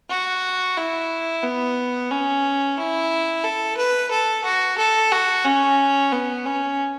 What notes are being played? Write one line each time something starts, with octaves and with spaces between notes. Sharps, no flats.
F#4
E4
B3
C#4
E4
A4
B4
A4
F#4
A4
F#4
C#4
B3
C#4